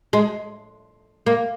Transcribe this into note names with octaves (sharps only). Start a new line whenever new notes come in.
G#3
A#3